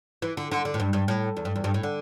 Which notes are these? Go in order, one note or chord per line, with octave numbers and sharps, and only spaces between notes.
E3
D3
D3
D3
A2
G2
G2
A2
E2
G2
E2
G2
A2
D3